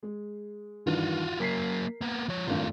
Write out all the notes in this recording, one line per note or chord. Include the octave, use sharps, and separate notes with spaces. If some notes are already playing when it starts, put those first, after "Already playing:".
G#3 G#4
G2 D#3 E3 F4 F#4
F#3 A#3 A#4 B6 C7
A#3 B3
F3 C#5
G#1 G2 A3 F4